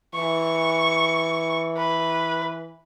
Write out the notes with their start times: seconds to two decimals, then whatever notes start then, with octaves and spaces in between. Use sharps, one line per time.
0.15 E3 C#6
1.77 B4